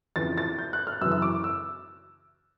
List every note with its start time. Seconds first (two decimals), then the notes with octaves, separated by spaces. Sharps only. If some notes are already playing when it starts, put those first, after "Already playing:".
0.16 F2 C#3 E3 A6
0.38 A6
0.59 G6
0.73 F#6
0.87 F6
1.01 F#2 C#3 E3 E6
1.12 E6
1.22 D6
1.44 E6